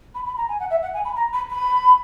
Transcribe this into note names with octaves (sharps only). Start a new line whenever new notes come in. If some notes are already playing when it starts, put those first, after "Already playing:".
B5
B5
A#5
G#5
F#5
E5
F#5
G#5
B5
A#5
B5
B5